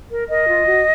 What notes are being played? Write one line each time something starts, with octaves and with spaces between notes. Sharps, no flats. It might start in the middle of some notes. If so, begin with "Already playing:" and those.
A#4
A#4 D#5
F4
F#4